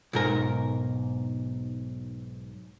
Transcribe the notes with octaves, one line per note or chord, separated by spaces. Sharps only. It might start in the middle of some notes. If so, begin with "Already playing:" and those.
B1 G#2 A#4